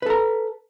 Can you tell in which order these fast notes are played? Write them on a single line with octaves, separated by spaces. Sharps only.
B4 A4 A#5